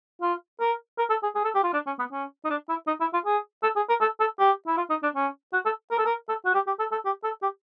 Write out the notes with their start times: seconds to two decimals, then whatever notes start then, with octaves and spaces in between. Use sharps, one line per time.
0.22 F4
0.60 A#4
0.98 A#4
1.10 A4
1.23 G#4
1.35 G#4
1.45 A4
1.55 G4
1.64 F4
1.73 D4
1.86 C#4
1.99 B3
2.12 C#4
2.45 D#4
2.50 D4
2.69 E4
2.87 D#4
3.01 E4
3.13 F4
3.26 G#4
3.63 A4
3.76 G#4
3.89 A#4
4.01 A4
4.20 A4
4.40 G4
4.67 E4
4.77 F4
4.90 D#4
5.03 D4
5.15 C#4
5.53 F#4
5.65 A4
5.91 A#4
5.98 A4
6.06 A#4
6.29 A4
6.46 F#4
6.54 G4
6.67 G4
6.79 A4
6.92 A4
7.05 G4
7.24 A4
7.43 G4